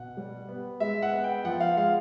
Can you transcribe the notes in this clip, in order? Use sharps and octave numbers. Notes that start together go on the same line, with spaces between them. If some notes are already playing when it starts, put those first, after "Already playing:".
Already playing: B2 F#5
G3
B3
G#3 E5
F#5
B3
G5
F3 F#5
F5
G#3 F5